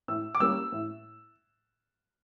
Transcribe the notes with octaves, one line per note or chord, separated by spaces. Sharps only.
A2 E6
D6
G3 A#3 C#4 E6
A2